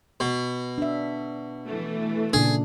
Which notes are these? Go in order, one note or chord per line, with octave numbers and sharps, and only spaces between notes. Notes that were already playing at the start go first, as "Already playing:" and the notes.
B2
D4 E5
E3 A3
A#2 C#3 D4 G#4